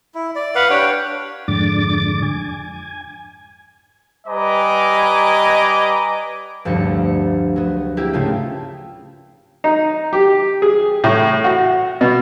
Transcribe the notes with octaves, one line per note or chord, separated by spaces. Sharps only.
E4
D5
B4 F5 F#5
D4 G4 C#5 G5
F2 G#2 D3 D6 A6
G#5
G3 B4 D#5 G#5 A#5 D6
F1 D2 G2 F3 C#7
F#3 B3
A#3 E4 G4
G#2 C#3 A3 F4
D#4
G4
G#4
A2
F#4
B2